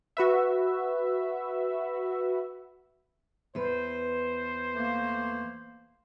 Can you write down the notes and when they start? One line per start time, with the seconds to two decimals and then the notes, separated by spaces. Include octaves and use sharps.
0.17 F#4 B4 E5
3.55 E2 B4 C5
4.74 A3 A#3